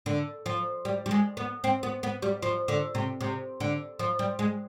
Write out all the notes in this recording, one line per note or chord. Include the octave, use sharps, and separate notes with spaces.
D3
F3
G3
G3
G#3
B3
C4
B3
B3
G3
F3
D3
C3
C3
D3
F3
G3
G#3